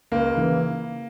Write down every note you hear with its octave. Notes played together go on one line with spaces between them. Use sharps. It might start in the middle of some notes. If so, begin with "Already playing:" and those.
C#2 A#3
C#3 E3